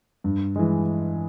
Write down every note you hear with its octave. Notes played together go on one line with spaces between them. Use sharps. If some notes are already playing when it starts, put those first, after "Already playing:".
G2
E3 G#3